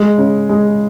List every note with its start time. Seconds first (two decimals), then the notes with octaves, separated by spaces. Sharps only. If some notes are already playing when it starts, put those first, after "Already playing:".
Already playing: G#3
0.18 C#3
0.49 G#3